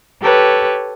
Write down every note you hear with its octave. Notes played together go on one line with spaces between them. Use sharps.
G4 A4 B4 C#5